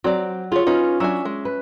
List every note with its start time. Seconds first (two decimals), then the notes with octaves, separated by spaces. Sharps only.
0.04 F#3 C4 D5
0.52 F4 G#4 C#5
0.67 C#4 D#4 F4 B4
1.00 F#3 D4 E5 G#5
1.25 G#3
1.45 B4